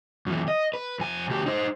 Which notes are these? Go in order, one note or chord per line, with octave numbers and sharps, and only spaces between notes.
F#2 E3
D#5
B4
F2 G#5
D2 G4
D#4 C5